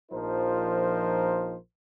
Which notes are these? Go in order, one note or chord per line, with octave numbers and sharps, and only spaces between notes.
A#1 F3 D#4 F4 A#4 C5